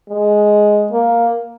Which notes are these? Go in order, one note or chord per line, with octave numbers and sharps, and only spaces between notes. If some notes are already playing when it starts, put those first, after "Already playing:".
G#3
A#3